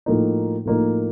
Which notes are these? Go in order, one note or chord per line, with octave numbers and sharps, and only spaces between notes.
A2 F3 A#3 D#4
A2 F3 A#3 D#4